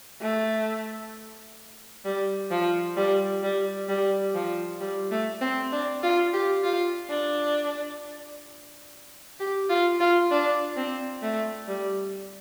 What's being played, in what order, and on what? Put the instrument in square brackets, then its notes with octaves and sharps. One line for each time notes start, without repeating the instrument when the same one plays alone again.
[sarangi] A3
G3
F3
G3
G3
G3
F3
G3
A3
C4
D4
F4
G4
F4
D4
G4
F4
F4
D4
C4
A3
G3